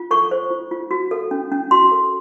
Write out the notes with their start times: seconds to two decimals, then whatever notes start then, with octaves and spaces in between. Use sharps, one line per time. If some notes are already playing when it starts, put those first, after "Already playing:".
Already playing: F4
0.11 A4 C#6
0.31 C5
0.50 F4
0.71 F4
0.91 F#4
1.11 A4
1.31 C#4
1.52 C#4
1.71 F#4 C6
1.92 A4